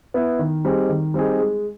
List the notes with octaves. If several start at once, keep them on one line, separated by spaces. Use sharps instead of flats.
B3 E4
D#3
G3 C4 D#4 G#4
D#3
G3 C4 D#4 G#4
G#3